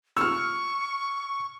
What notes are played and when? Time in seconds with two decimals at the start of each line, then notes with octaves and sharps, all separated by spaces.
0.17 C#6 E6 F6